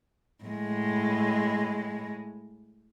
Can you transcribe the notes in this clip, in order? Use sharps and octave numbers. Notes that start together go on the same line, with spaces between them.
A2 G#3